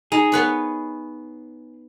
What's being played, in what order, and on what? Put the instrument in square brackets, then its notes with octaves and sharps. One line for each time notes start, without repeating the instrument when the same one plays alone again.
[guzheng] D#4 [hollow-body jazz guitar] G#4
[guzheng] B3 B4 C#5